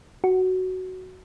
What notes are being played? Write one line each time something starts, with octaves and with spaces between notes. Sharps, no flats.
F#4